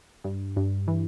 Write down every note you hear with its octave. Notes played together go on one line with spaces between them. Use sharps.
G2
G2
E3